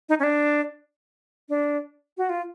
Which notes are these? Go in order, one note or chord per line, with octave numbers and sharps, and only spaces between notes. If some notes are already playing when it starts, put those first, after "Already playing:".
D#4
C#4
D4
D4
F#4
F4